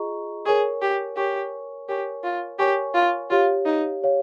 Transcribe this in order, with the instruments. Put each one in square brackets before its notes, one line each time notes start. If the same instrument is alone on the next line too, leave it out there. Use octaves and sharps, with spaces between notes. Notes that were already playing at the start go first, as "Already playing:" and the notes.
Already playing: [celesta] F4 G#4 D#5 A#5 C#6
[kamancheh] G#4 [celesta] A#4 C#5 G#5 C#6
[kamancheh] G4
[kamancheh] G4 [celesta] A#4 C#5 G#5 C#6
[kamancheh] G4 [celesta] A#4 C#5 G#5 C#6
[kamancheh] F4
[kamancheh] G4 [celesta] A#4 C#5 G#5 C#6
[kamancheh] F4
[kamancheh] F4 [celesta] G4 C#5 F5
[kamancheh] D#4
[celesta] G4 C#5 F5